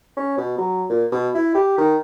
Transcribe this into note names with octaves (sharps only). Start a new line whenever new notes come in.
C#4
B2
F#3
A#2
B2
E4
G4
D#3